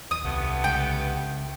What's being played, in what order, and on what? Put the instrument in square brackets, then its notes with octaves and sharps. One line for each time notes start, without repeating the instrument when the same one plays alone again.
[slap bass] D#2 [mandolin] D#6
[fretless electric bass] C2 [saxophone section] G2 A3 B3
[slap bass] C#2 [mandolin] G5